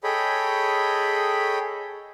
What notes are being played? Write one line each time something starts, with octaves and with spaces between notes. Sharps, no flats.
G#4 A4 C#5 D#5 G5 B5